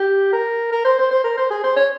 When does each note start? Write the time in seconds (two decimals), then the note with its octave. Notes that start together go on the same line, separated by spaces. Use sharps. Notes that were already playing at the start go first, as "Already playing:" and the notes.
Already playing: G4
0.33 A#4
0.72 A#4
0.85 C5
0.98 C5
1.11 C5
1.24 A#4
1.38 C5
1.50 G#4
1.64 C5
1.76 C#5